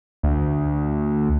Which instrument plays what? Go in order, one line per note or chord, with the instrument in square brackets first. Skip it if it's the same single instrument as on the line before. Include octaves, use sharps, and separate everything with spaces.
[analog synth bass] D2